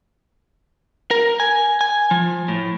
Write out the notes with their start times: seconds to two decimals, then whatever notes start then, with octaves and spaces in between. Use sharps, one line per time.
1.11 A#4
1.40 G#5
1.81 G#5
2.11 F3
2.48 A2